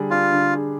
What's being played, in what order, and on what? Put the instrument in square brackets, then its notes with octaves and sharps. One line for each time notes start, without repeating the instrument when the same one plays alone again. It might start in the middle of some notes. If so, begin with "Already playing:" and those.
Already playing: [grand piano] D3 G3 D4 G#4
[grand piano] D4 [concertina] F4
[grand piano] D3
G#4